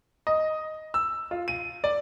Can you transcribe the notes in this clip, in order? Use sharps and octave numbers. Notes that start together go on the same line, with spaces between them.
D#5
E6
F4
D#7
D5